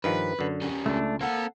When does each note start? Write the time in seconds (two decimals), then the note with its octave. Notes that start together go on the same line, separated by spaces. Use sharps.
0.04 G2 D#3 F3 B4
0.39 F#2 D3
0.62 G3 C#4
0.86 C#2 A3 D4
1.21 A#3 C4 A4 F#5